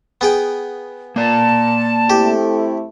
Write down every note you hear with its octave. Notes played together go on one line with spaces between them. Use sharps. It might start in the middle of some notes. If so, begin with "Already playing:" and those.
B3 G#4 G5
A#3 D5 A5
A3 C4 E4 G4